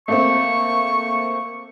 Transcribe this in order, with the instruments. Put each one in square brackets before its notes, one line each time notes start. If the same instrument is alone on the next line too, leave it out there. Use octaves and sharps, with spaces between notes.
[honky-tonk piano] A3 A#3 C4 [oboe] C#6